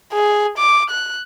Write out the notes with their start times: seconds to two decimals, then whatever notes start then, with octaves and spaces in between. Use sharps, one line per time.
0.13 G#4
0.58 D6
0.90 F#6